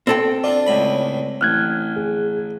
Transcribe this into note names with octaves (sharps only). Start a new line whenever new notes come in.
C4 A4 G5
D4 F4 D5
C#2 A2 B5
A1 F6 F#6 G#6
G#4